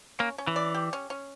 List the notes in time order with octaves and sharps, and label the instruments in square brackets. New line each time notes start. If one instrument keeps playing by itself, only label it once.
[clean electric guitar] A#3 [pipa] C#4
[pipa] C#4
[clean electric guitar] E3
[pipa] D5
G4
C#4
C#4